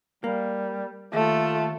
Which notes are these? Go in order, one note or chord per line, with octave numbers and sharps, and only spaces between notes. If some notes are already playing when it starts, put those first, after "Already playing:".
G3 A#3
D#2 A3 F4